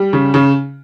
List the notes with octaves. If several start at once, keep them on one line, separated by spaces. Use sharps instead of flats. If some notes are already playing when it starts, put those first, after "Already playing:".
Already playing: G3
C#3
C#3